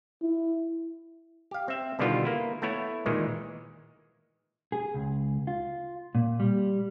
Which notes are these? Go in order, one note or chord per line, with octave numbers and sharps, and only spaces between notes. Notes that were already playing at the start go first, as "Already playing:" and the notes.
E4
G4 F5
C4 E5
B2 D3 D#3 G3 B3 F4
A#3 E4
A3 B3 E4 C#5
A#2 D#3 E3 G#3
G#4
C#2
F4
A#2
G3